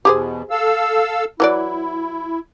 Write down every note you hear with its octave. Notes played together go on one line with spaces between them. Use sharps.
E2 B2 G4 G#4 C5
A4 F5 E6
E3 F#3 E4 D5